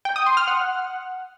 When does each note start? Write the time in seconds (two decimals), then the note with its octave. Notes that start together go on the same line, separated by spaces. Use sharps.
0.05 G5
0.16 D#6
0.26 C6
0.37 F6
0.48 F#5